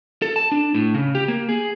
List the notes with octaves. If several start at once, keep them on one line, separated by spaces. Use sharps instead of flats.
A4
A5
D4
A2
C#3
G4
A#3
G#4